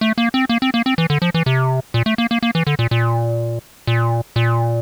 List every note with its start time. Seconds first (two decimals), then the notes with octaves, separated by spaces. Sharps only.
0.01 A3
0.18 A#3
0.34 C4
0.49 A#3
0.62 C4
0.74 A#3
0.86 C4
0.98 E3
1.10 D3
1.22 F3
1.34 E3
1.46 C3
1.94 A#2
2.06 A3
2.18 A#3
2.31 A#3
2.43 A#3
2.55 E3
2.67 D3
2.79 A#2
2.91 A#2
3.87 A#2
4.36 A#2